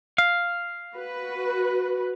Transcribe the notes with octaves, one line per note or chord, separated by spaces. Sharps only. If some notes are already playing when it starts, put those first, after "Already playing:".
F5
F#4 B4